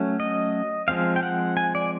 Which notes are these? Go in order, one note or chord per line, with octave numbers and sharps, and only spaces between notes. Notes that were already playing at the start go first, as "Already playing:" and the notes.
Already playing: F#3 A3 C#4
D#5
F3 G#3 C4 F5
G5
F#5
G#5
D5